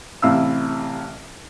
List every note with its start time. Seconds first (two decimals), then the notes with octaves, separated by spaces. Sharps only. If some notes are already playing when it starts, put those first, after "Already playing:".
0.22 A1 C3 E4 F5 E6